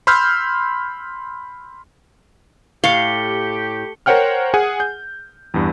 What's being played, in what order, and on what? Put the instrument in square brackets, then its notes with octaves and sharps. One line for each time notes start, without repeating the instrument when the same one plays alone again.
[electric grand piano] B5 C6 E6 F6 G6
[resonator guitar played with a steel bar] A2 [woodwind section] G4 [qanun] F5 [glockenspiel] C#7 G7
[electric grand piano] A#4 C5 C#5 F#5 G5 F6
G#4 F#5 G#5
G6
E2 G2